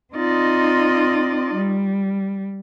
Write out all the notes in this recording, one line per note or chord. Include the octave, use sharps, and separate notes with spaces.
C4 D#4 F4 D5 D#5
G3